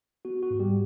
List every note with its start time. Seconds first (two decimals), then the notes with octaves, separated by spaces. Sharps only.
0.25 B3 F#4
0.43 F#4
0.50 G#2
0.60 G3 G4